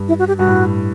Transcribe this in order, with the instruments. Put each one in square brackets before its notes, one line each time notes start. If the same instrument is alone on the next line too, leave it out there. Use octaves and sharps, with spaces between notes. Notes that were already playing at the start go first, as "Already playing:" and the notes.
Already playing: [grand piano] G2
[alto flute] E4
F#4
G4
[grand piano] G2 [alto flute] F#4
[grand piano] A2